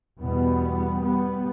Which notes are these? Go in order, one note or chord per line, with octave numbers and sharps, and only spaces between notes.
E2 B2 G3 B3
G3 B3